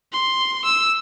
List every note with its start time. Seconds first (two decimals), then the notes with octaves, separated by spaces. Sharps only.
0.12 C6
0.65 E6